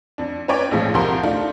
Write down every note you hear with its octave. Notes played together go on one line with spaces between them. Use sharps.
F2 D4
C#4 B4 C#5 D5 G5
A#1 F2 A2 F3 G#3
C2 F3 G4 A#4 C6
A3 D4 D#4 F4